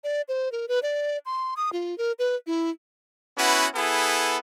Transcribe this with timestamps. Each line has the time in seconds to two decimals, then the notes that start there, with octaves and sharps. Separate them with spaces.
0.04 D5
0.28 C5
0.52 A#4
0.68 B4
0.83 D5
1.26 C6
1.57 D#6
1.73 F4
1.98 A#4
2.19 B4
2.47 E4
3.37 B3 C#4 E4 F#4 B4
3.75 B3 E4 G#4 A4 B4